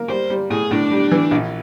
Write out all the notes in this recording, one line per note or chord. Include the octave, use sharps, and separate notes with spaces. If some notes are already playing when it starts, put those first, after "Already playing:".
Already playing: A#3
G3 C5
G3
A2 G#4
A2 D4
G3
E3
A#1